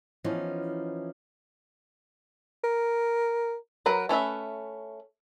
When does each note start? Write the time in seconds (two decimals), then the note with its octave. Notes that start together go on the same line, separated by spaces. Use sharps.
0.24 E3 F3 B3 C#4 D#4
2.64 A#4
3.86 F#3 A#4 B4
4.09 A3 C#4 B4 E5